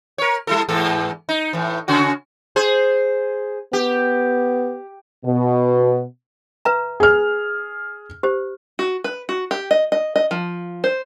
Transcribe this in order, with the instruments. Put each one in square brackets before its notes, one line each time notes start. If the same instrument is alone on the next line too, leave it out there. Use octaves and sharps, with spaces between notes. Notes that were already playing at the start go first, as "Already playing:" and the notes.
[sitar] A#4 C#5
G3 E4 A4
E2 G#2 A4
D#4
A2 E3
C#3 C#4 F#4
G#4 C5
[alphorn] B3 [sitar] G4
[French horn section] B2
[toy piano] B4 E5 A#5
[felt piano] G#4 F6
[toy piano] G4 C5
[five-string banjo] F#4
B4
F#4
G4
D#5
D#5
D#5
F3
C5